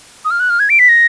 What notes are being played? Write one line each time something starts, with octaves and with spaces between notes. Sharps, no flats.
D#6
F6
F#6
F6
G#6
D7
B6
A#6